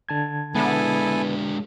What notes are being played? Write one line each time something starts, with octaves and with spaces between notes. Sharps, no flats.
D3 A5 G#6
G#3 B3 D4 E4 A4 G#5